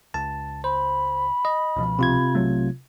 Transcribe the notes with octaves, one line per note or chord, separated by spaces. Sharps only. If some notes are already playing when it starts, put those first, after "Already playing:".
C#2 A5
C5 B5
D#5
C#2 B2 F3
C3 F4 G#6
B1 F#3 A3